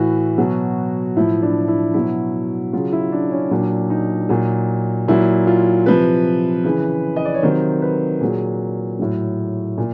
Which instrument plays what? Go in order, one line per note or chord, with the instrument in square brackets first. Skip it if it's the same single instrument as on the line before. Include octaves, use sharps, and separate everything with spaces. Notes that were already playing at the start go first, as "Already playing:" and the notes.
Already playing: [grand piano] A2 E3 F#4
B2 F#3
A2 F3 E4
D4
E4
B2 F#3 E4
C#3 F#3 F4
E4
D4
C#4
A#2 F#3 D4
D#4
A#2 F#3
A#2 F#3 E4
F4
C3 F3 B4
C#3 E3
D#5
D5
C#5
C3 D#3 F#3 C5
B4
A#2 F#3 G#4
A2 F#3
A#2